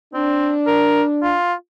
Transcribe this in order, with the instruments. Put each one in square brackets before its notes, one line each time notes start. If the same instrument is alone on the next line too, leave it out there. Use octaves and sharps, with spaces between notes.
[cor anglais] C4 [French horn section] D4
[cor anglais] A#4
F4